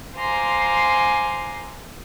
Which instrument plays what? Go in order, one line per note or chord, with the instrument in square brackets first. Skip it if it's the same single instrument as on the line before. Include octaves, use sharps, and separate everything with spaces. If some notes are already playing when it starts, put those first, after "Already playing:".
[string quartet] C5 F5 G#5 A#5 C6 D6